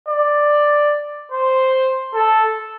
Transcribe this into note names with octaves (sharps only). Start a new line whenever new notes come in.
D5
C5
A4